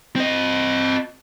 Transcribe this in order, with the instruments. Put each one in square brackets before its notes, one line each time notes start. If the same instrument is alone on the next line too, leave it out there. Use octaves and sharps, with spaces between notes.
[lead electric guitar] C4 D#5